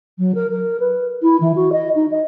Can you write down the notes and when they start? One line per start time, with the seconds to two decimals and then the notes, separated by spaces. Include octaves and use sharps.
0.18 F#3
0.35 A#4
0.51 A#4
0.80 B4
1.22 E4
1.40 E3
1.56 F#4
1.72 D#5
1.95 D#4
2.11 D#5